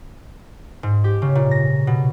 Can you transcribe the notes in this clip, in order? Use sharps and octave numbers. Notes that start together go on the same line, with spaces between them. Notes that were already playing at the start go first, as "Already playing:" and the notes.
G#2
G4
C#3
A#2
A#6
B2